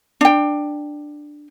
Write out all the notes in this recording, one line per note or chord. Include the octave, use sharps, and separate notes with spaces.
D4 G5